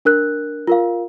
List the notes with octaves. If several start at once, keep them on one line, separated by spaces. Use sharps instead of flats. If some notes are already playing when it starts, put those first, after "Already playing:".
D4 A#4 F#6
F4 A#4 F5